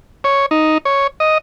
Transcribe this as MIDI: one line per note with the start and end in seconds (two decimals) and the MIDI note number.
0.24 0.46 73
0.51 0.78 63
0.85 1.07 73
1.20 1.38 75